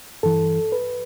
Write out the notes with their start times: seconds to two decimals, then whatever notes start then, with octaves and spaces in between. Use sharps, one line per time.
0.23 G2 E3 A4
0.72 B4